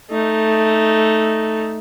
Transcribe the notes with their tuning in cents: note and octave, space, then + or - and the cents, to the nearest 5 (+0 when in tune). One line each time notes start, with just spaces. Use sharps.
A3 +0 D#4 +0